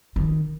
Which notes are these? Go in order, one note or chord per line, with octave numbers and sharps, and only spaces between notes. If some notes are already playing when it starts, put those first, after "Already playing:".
D#3